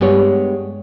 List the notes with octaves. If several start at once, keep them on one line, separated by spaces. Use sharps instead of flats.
G2 G#3 B3 G4 C#5